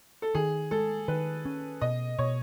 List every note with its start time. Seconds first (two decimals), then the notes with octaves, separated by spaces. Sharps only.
0.22 A4
0.35 D#3 G#4
0.71 G#3 A4
1.08 D#3 B4
1.45 C#4
1.81 B2 D#5
2.19 B2 C#5